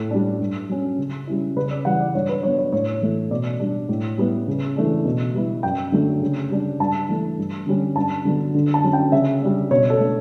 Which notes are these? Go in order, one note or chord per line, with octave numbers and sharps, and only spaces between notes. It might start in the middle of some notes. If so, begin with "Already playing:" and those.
Already playing: A2 A4
G3 D4
G2
F#3 C#4
C#3
G3 C#4 E4
C#3 B4
D5
E3 G3 F#5
D5
G2 C#5
B4
F#3 B3 D4 C#5
C#5
A2 C#5
E3 A3 E4
B2 D5
G3 D4
A2
G3 B3 E4
C#3
E3 A3 D4
B2
G3 B3 E4
F#2 G5
D3 F#3 A3 D4
C#3
G3 D4
G2 A5
E3 A3 D4
G2
D3 G3 C#4
G2 A5
D3 F#3 B3
D3
A5
F#3 C#4
G5
C#3 E5
G3 D4
B2 C#5
A4
A3 D4